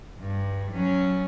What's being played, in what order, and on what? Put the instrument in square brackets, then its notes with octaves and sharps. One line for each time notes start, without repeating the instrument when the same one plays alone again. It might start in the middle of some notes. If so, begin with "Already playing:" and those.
[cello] G2
F#3 C#4